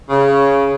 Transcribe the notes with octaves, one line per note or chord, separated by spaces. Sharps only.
C#3